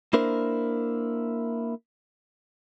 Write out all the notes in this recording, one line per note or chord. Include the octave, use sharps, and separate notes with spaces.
A#3 D4 E4 A#4 C5